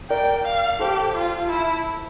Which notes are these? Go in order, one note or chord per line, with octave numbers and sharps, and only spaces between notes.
A#4 D5 G5
F5
G4 A4 C5
F4
E4